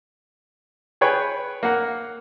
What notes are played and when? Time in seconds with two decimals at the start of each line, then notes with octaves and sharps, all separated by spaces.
1.01 G#4 B4 C#5 G5
1.63 A#3 F#5